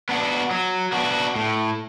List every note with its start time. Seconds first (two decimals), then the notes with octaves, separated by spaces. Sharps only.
0.09 B3 D4 F#4
0.51 F#3
0.92 B3 D4 F#4
1.36 A2